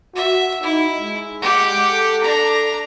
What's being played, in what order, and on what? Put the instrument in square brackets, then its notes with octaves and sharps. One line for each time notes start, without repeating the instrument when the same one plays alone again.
[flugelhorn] F#4 [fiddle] E5
[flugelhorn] D#4 [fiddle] E4
[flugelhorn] G#3
[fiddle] G4 F#5
[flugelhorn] A4
[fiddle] D4 A#5